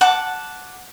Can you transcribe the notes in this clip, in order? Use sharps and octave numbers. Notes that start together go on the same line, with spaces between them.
F#5 A5 D6